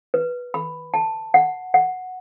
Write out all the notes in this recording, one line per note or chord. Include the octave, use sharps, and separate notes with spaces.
B4
B5
A5
F#5
F#5